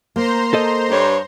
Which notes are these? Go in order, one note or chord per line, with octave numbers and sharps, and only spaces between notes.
A#3 C5 A#5 C6
A4 D#5
G2 C#5